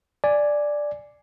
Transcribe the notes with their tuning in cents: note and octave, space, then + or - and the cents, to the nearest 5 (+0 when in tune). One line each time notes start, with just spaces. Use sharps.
D5 +0 G#5 +0